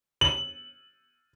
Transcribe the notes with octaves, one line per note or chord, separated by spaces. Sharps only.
F#7